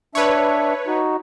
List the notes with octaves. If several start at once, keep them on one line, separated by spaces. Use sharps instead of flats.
D4 B4 C#5 E5
D#4 F#4